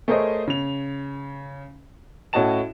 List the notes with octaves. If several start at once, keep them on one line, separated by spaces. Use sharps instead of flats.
A3 G#4 A#4 C5 C#5 D#5
C#3 F7
A2 C#4 F#4 D#5 A5 E7